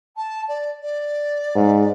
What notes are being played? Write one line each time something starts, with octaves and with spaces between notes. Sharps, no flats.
A5
D5
D5
G#2